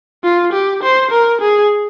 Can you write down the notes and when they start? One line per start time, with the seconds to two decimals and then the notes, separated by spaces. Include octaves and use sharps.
0.24 F4
0.53 G4
0.83 C5
1.11 A#4
1.41 G#4